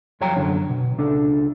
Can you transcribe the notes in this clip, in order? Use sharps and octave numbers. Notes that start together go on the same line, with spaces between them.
F2 F#3 C#5 G5 A#5
F#2 D3 F#3
B2
C#2 D4 A4